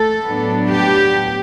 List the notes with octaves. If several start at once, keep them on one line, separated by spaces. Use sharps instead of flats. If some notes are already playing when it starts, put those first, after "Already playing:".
Already playing: A3 A4
A2 F#3 B3 D4
G4